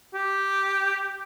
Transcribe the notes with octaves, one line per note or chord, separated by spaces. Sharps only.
G4